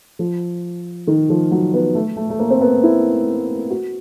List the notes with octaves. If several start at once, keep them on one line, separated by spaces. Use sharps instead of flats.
F3
D#3
F3
F#3
B3
A3
A3
A3
A#3
C4
B3
E4
F#4